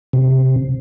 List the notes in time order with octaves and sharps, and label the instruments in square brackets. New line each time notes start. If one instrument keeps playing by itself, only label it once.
[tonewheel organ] C3